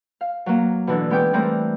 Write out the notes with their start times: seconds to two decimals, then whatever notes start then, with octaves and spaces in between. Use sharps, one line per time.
0.21 F5
0.46 F#3 A#3
0.87 B2 D3 E3 D4
1.10 G#3 B3 C#4 G5 D6
1.33 E3 G3 A3 C4 A4 A#4